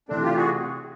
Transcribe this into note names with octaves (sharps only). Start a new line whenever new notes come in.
C3 E3 A3 C4 D4
F4 G4
F#4 G#4